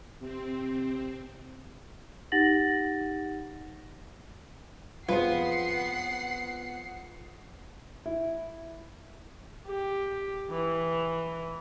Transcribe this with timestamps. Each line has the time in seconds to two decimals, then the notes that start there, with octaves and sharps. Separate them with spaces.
0.21 C3 C4
2.32 D#4 G4 F#5 A6 A#6 F#7
5.09 F2 B3 F4 G#4 C5 F#5 C7
8.06 E4
9.66 G4
10.51 E3